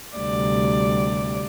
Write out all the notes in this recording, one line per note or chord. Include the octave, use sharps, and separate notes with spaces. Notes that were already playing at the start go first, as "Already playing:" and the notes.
D2 C3 G3 D5